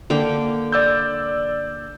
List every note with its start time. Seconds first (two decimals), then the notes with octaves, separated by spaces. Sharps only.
0.10 D3 A#3 G5
0.72 D5 E6 G6